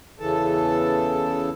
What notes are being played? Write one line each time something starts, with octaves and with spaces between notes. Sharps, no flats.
E2 C#3 E3 A4 A5